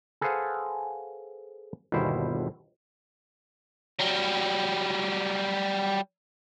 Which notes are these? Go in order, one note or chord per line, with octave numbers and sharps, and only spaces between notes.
G#4 A4 B4 C5 F5 F#5
G1 D#2 B2 G3 E4 C5
F#3 G3